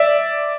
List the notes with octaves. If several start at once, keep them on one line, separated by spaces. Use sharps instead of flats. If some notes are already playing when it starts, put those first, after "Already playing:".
Already playing: D5 E5